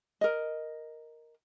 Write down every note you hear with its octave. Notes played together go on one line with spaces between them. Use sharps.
A#4 D#5